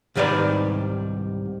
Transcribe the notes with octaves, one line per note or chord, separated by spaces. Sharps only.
C2 G#2 D#3 G3 B4 D5